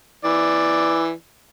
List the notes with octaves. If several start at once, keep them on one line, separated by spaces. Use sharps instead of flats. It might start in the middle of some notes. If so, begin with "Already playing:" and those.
E3 D5